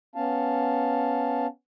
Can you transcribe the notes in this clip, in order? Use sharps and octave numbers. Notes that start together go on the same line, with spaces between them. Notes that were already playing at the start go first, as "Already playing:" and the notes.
B3 C#4 F5 A5